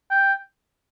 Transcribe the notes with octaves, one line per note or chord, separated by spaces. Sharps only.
G5